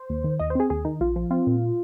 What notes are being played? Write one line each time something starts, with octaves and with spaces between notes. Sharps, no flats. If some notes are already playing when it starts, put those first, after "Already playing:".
Already playing: C5
D#2
D#3
D#2 D#5
C5
C4 G#4
D#2 G#4
D#3 D#4
A#1 F4
F3
C4 F4
A#2